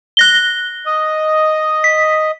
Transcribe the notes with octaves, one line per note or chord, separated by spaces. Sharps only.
F#6 A#6 G7
D#5
B6